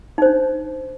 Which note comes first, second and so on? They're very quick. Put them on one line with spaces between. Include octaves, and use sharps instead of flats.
D#4 C5 D4